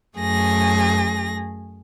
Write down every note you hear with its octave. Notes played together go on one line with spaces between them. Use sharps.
F#2 A3 G#4 A#6